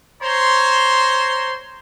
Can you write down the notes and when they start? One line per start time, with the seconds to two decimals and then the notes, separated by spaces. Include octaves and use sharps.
0.22 C5 C#5 A#5 C6